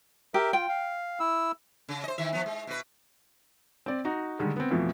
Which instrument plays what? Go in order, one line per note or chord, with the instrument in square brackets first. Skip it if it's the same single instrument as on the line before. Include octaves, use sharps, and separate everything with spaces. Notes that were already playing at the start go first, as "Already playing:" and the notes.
[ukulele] G4 [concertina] A#4 E5
[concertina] F4 [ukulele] G5
[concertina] F5
E4 E6
[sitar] C#3
C5 D#5
D#3 E3 E5
F3 B3
G#3
B2 B4
[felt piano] C4 D5
D#4 F#4
D3 D#3 G3 G#3
B3 C4
F2 B2 E3 F3 A3